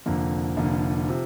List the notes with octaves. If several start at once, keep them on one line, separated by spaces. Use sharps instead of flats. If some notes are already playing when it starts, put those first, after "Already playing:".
F1 F2 D3 A#3
F1 F2 D3 A#3
C3 F3